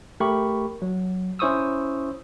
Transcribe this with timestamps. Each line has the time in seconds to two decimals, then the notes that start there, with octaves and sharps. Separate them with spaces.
0.20 A3 G4 A#4 B5 C#6
0.82 F#3
1.39 C#4 E4 C5 C#6 D#6 E6